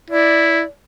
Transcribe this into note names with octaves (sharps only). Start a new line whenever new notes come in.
E4 D5